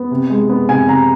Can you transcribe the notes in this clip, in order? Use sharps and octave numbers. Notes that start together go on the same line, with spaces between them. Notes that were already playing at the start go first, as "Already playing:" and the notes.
Already playing: B3
C3
G#3
B3
C3 G#5
C3 A#5